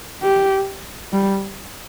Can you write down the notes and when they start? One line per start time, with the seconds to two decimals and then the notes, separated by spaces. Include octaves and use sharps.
0.23 G4
1.13 G3